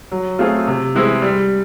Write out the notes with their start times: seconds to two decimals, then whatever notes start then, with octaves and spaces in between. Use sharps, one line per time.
0.12 F#3
0.39 A3 C4 F4 G#4
0.67 C3
0.95 E3 G#3 C4 E4
1.22 G3